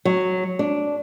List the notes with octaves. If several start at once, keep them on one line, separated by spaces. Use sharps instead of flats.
F#3
D4